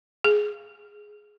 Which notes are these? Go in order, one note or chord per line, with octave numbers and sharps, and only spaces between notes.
G#4